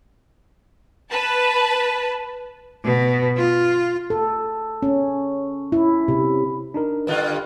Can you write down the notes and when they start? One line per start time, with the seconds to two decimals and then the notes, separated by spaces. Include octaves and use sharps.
1.10 B4 A5
2.84 B2
3.37 F4
4.10 A4
4.82 C#4
5.72 E4
6.08 C3
6.74 D4 D#4 A#4
7.07 G2 D3 F4 B4 D#5 F#6